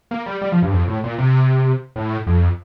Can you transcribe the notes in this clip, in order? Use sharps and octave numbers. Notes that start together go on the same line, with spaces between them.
A#3
G3
G3
F3
G2
F2
A2
A#2
C3
A2
F2